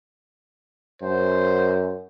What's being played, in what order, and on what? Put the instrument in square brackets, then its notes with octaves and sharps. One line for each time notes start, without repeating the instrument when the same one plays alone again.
[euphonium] F#2 [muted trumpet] C5